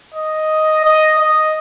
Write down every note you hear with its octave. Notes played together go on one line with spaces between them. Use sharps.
D#5
D#5
D#5